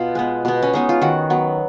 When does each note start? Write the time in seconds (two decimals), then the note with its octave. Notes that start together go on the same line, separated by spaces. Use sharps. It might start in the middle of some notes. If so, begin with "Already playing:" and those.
Already playing: B2 F4
0.15 G#3 B3
0.45 B2 B3
0.62 C#4
0.73 G#3 B3 D#4
0.89 F4
1.02 D#3 F#4
1.30 F#3 B3